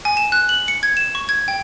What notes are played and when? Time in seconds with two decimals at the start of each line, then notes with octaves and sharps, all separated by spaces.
0.05 G#5
0.17 E7
0.32 F#6
0.49 F#7
0.68 C#7
0.83 G#6
0.97 E7
1.15 C#6
1.29 G#6
1.48 G5